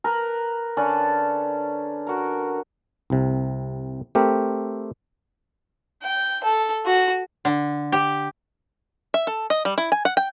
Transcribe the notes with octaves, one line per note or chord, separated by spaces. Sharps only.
A#4 B4 A#5
D3 C#4 B4 A5
F#4 A#4
C2 C3
A3 C4 G4 A#4
G5
A4
F#4
D3
G4
E5
A4
D#5
G3
E4
G#5
F#5
G5